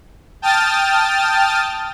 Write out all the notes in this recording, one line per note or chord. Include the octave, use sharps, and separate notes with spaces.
G5 A5 D#6 F6 A6